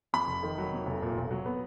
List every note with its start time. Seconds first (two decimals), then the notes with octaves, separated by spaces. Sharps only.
0.13 F2 B5
0.28 F1
0.43 D#3
0.58 F#3
0.73 F2
0.86 F1
1.02 A#2
1.17 B1
1.31 F#3
1.46 B3